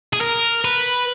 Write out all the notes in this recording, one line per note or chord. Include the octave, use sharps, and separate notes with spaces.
G#4
A#4
B4